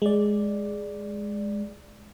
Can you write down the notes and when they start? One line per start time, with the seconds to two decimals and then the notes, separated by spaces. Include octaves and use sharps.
0.02 G#3 D5